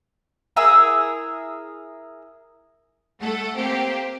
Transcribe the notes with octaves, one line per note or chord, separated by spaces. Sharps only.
E4 G#4 A#4 E6
A3 A4 F#5
A#3 C4 G4